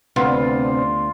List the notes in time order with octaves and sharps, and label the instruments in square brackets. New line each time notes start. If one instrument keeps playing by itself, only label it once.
[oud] D2 B3 [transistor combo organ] C3 C4 D4 [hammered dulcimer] F4